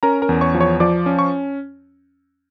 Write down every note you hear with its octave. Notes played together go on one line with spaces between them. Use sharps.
C#4 A#4 A#5
A#4 A#5
E2
C#5 C#6
F3
C#5 C#6
F3 D5 D6
C#4
C#6